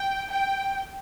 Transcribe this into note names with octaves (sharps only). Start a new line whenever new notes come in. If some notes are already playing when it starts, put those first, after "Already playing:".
Already playing: G5
G5